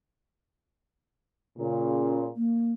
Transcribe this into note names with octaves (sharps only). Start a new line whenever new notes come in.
A#2 C#3
A#3